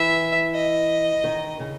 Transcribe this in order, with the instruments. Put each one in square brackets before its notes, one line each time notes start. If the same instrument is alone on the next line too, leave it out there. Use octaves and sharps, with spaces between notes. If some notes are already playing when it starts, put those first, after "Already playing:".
Already playing: [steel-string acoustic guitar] E3 [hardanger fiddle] E5
[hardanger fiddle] D#5
[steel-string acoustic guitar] D#3
C#3